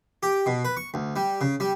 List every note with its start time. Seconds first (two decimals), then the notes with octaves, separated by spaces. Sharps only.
0.23 G4
0.46 B2
0.65 B4
0.77 C#6
0.94 D2
1.16 G3
1.41 C#3
1.60 G3